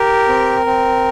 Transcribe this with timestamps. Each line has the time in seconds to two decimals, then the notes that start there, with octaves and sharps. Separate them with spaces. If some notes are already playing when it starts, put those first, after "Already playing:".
Already playing: G4 A#4
0.28 C4
0.66 C4